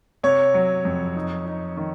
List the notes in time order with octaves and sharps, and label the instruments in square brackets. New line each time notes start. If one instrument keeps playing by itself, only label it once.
[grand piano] C3 [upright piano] C#5
[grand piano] F#3
F2
D#4
D#4
D#3